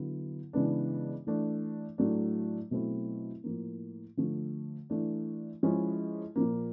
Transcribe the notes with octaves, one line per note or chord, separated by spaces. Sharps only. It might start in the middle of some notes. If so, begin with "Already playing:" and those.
Already playing: D3 F#3 B3 E4
C#3 E3 G#3 B3 D4
E3 A3 D4
A2 F#3 A3 D4
B2 F#3 A3 C4 E4
A2 F3 A#3
D3 F3 A3
E3 A3 D4
F3 G#3 C#4 E4
A#2 F3 A#3